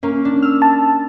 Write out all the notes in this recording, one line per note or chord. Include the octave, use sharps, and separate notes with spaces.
A#3 C#4
D4
E6 F6
A5